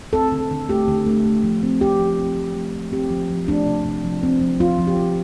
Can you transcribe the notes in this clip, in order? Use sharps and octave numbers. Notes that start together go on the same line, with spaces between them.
C4 A4
D3
D3
A3 G4
D3
A3
A3
F3
C4
C4 G4
F3
C4
F3
A3
F3
C4 G4
F3
F3
A3 D4
C3
C3
F3
C4
F3
F3 F4
F3
G4
F3